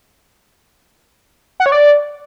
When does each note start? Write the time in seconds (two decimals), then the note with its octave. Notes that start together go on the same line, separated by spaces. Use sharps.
1.60 F#5
1.66 C#5
1.72 D5